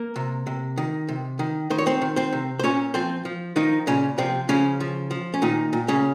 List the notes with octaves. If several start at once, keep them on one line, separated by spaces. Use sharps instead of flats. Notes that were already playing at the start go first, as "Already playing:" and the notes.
Already playing: A#3 A#4
C3
C3
D#3
C3
D#3
D#3 C5
C#5
C4 C5
D#3
C4 C5
C3
C5
A#2 C#4 C#5
F3 C4 C5
F3
D#3 F3 D#4
A#2 C#3 C#4
C3 F3 C4
C#3 F3 C#4
F3
F3
C#4
A#2 D#3 D#4
A#2
C#3 C#4